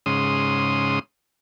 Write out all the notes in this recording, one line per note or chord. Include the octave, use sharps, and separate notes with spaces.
G#2 C#3 C6 D#6